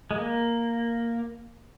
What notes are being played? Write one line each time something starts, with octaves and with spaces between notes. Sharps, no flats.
G#3
A#3